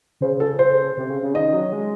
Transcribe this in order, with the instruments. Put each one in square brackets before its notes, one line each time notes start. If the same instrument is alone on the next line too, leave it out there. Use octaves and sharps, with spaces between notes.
[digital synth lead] C#3 [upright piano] C5
[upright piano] A4
C5
[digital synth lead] C3
C#3
C#3
[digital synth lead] D#3 [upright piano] D#5
[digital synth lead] F#3
G#3